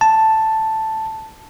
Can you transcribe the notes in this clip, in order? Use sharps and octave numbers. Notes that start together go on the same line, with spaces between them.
A5